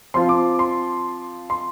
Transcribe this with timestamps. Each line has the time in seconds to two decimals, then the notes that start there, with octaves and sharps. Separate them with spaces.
0.14 F3 C4 F4 C6
0.29 D6
0.59 C6
1.50 C6